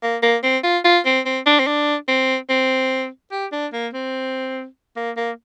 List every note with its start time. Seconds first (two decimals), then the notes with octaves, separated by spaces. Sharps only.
0.03 A#3
0.22 A#3
0.43 C4
0.63 F4
0.84 F4
1.06 C4
1.26 C4
1.46 D4
1.59 C4
1.67 D4
2.08 C4
2.50 C4
3.32 G4
3.52 D4
3.73 A#3
3.93 C4
4.96 A#3
5.17 A#3